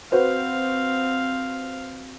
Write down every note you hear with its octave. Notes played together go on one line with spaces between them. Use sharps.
C4 F#4 B4 C5 F5